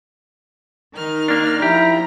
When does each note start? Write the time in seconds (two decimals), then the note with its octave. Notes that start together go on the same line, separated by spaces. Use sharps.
0.94 D#3 D#4 F6
1.28 A#3 D4
1.62 F3 E4 G4 A#5